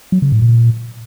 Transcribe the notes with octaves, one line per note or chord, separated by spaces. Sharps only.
F#3
C#3
A2
A#2